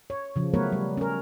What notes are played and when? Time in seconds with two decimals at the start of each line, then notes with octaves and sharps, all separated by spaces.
0.10 C#5
0.36 C#3 F3
0.54 F#3 A3 B3 A#4 B4 C#5
0.72 G3
0.97 C#4 A#4